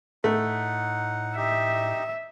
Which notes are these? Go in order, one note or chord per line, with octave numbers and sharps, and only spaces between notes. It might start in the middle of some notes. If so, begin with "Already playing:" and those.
A2 A3 D#4 F#5
D#4 G4 D#5 E5